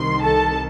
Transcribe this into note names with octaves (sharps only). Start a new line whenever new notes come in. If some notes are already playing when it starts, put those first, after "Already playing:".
Already playing: C2 C3 D#3 C6
A4 A5